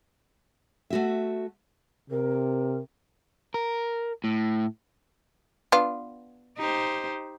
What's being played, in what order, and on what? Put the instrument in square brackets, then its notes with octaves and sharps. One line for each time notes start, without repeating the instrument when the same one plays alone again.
[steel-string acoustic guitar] A3 F#4 E5
[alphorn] C3 [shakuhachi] A#4
[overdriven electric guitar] A#4
A2
[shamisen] B3 D4 F4
[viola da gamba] D#4 G4 C5